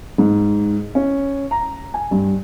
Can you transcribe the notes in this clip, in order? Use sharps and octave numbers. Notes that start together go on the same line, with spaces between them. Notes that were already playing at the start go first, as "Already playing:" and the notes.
G#2
C#4
A#5
G#5
G2